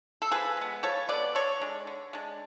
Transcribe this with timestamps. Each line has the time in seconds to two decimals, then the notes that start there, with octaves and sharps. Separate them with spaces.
0.22 A4
0.32 F3 G#4 B4
0.57 G#3 B3
0.83 F3 A4 C#5
1.09 G#3 B3 B4 D5
1.35 D3 A4 C#5
1.61 G#3 D4
1.87 D3
2.13 G#3 D4